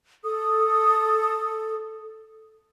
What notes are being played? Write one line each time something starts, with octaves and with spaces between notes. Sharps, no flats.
A4 D#6